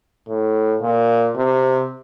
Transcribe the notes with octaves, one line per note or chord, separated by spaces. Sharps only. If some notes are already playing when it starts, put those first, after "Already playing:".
A2
A#2
C3